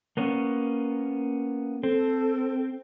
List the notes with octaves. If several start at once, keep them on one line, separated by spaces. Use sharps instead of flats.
A#3 B3 C#4
C4 A4